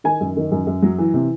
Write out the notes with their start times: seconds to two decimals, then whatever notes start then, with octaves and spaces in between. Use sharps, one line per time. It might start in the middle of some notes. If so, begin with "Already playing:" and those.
0.04 D#3 G#5
0.21 F#2
0.37 D#3
0.51 F#2
0.67 F#2
0.82 F#3
0.98 E3
1.14 C3